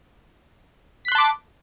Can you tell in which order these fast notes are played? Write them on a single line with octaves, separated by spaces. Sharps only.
B6 F#6 C6 A5 D6